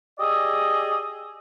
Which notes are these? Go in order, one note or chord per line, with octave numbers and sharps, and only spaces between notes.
G4 G#4 D5 D#5 D#6 E6